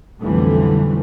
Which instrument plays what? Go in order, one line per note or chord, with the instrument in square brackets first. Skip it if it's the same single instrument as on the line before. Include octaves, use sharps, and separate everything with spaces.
[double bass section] B1 F2 D3 E3 G3 A3